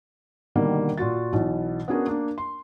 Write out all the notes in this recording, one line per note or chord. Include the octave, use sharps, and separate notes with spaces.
B2 D3 D#3 G3 A#3
A#2 F4 F#4 A6
B1 B2 E3
B3 C#4 D4 F#4 G#4 A#4
A#3 D4
C6